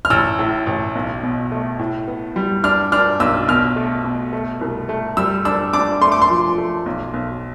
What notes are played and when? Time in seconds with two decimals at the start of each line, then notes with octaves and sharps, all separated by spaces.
0.05 F6
0.10 A1 E6
0.39 A2
0.67 A1
0.95 B1
1.23 B2
1.52 A3
1.79 A2
2.08 B3
2.36 G3
2.64 D4 F6
2.92 D4 F6
3.20 B1 E6
3.48 B2 F6
3.76 A3
4.04 B2
4.33 A3
4.61 C2
4.89 A3
5.17 G3 E6
5.45 D4 E6
5.73 D4 D6
6.02 A3 C6
6.12 D6
6.22 C6
6.30 F3
6.58 A3
6.86 B1
7.14 B1